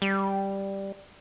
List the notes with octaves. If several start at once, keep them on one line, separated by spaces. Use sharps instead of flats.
G3